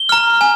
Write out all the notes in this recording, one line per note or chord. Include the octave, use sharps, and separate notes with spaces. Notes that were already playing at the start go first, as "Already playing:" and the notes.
Already playing: G7
A#5 F6
G#5